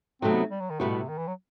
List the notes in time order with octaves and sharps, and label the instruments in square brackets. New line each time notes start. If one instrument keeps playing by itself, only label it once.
[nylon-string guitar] C3 F#3 A3 D#4 F#4 [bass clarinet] C4
[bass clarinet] B3
G3
F#3
D#3
[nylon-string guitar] A2 G3 B3 F#4 [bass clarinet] C3
[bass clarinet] B2
C3
D#3
E3
F#3